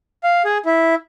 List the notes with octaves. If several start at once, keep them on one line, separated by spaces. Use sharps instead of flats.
F5
G#4
E4